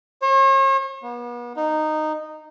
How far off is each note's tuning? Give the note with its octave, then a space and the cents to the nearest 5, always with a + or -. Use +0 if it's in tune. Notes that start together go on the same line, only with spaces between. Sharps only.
C#5 -45
B3 -40
D#4 -10